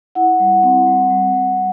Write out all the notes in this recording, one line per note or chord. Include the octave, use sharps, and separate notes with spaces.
E4 F#5
G3
C4
G3
G3
G3
G3